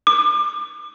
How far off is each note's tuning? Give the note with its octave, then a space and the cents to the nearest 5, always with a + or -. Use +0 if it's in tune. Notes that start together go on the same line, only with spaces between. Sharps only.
D6 +35